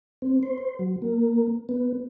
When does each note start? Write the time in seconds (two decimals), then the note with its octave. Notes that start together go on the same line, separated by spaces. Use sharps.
0.22 C4
0.43 C5
0.58 C5
0.79 F#3
1.02 A#3
1.69 B3